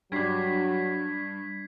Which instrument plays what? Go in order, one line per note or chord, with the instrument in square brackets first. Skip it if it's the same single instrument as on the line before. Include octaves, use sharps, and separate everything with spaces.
[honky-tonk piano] G2 [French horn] F#3 [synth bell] G3 D4 [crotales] G#6 B6 C7